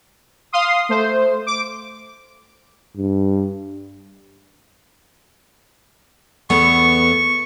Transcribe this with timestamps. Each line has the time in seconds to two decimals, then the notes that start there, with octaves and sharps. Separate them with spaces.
0.52 F5 C6 D#6
0.89 A3 C5
1.46 D6
2.97 G2
6.50 E2 A3 B3 C#6